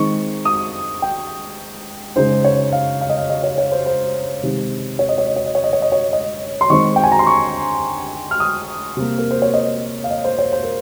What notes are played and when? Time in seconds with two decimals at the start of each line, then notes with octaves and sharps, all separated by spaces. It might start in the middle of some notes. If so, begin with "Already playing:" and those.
Already playing: D#3 G#3 C4 D#4 C#6
0.45 D#6
1.02 G5
2.16 C#3 G#3 D#4 C5
2.45 C#5
2.73 F5
3.01 F5
3.10 D#5
3.17 F5
3.30 D#5
3.43 C#5
3.58 C#5
3.72 C5
3.86 C5
4.43 C3 D#3 G#3 D#4
4.99 C#5
5.09 D#5
5.18 C#5
5.27 D#5
5.36 C#5
5.46 D#5
5.55 C#5
5.64 D#5
5.73 C#5
5.82 D#5
5.92 C#5
6.13 D#5
6.61 C6
6.70 D#3 G#3 C4 D#4 C#6
6.96 G5
7.03 G#5
7.12 A#5
7.19 C6
7.27 C#6
8.31 F6
8.40 D#6
8.97 C3 G3 A#3
9.18 A#4
9.31 C5
9.42 C#5
9.54 D#5
10.04 F5
10.10 D#5
10.24 C5
10.39 C#5
10.53 C5
10.63 A#4